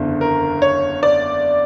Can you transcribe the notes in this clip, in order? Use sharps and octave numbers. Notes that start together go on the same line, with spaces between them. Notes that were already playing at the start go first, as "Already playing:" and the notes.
Already playing: F#1 E2 D3
A#4
C#5
D5